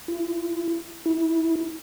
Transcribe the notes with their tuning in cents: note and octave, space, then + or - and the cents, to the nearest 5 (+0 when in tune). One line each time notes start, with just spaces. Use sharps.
E4 +40
E4 -20